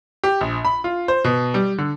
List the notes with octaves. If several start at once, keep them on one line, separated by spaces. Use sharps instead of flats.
G4
A#1
B5
F4
C5
B2
G3
D3